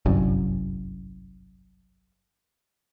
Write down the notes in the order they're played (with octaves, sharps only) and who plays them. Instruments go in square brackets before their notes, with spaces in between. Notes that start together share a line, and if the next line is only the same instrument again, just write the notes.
[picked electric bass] G1 C2 F#2